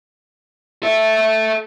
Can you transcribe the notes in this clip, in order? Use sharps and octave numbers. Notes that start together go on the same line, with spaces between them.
A4 E5